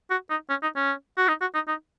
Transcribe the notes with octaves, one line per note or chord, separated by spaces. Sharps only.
F#4
D#4
C#4
D#4
C#4
F#4
D#4
F#4
D#4
D#4